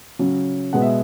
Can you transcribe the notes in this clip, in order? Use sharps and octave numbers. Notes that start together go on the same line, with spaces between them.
C#3 F#3 C#4
B2 G#3 B3 F#5
E5